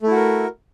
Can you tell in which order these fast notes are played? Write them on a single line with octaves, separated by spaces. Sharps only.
A3 E4 F#4 A#4